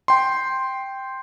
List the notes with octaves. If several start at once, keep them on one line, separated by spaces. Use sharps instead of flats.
G5 C6